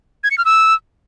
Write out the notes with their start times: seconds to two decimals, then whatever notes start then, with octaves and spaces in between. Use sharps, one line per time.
0.24 G#6
0.31 C#7
0.38 F6
0.45 E6